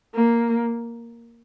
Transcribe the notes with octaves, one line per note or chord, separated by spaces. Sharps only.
A#3